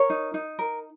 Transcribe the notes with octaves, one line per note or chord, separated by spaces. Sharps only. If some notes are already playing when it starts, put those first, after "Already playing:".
Already playing: A#4 C#5
D#4
D#4
A#4